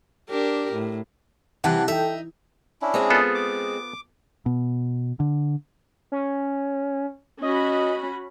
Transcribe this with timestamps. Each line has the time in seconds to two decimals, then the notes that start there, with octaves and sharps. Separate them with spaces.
0.30 D4 G4 A#4
0.73 A2
1.64 C3 E3 G3 C4 F#5 A5 F#6
1.88 D#4 A4 E5 G5
2.82 C#4 D4 E4
2.94 G#3 C4 G#4
3.10 B3 F4 A4
3.35 D6
4.46 B2
5.20 D3
6.12 C#4
7.42 C#4 F#4 D#5 B5